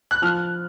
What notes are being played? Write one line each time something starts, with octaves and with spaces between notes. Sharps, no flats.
F#6
F3 F6